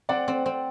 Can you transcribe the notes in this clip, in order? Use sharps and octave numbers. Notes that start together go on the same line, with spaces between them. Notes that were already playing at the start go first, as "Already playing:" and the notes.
C4 D5 F#5
C4
C4